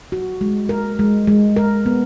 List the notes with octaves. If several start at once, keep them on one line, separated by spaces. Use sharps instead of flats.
F#4
G#3
A#4
G#3
G#3
A#4
B3